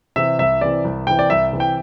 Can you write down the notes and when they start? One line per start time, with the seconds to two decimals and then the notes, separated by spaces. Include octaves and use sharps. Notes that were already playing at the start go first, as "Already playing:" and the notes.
0.16 C3 E3 E5
0.39 C2 E5
0.61 C3 E3 D5
0.85 C2
1.07 C3 E3 G5
1.19 D5
1.30 C2 E5
1.53 C3 E3
1.60 G5